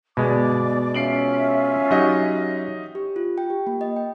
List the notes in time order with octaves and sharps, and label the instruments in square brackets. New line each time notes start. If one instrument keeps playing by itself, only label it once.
[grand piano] G1 [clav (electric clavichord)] B2 G#3 [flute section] D5 D6
[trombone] C#4 [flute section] F4 E5 [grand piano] C7 D7 F#7
[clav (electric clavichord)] F#3 [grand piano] D#4 G4 D#5
[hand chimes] G4
F4
G5
G4
A#3
D#5
G5